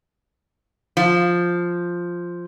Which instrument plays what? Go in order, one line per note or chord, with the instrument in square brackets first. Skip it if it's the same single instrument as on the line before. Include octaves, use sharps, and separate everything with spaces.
[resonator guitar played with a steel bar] F3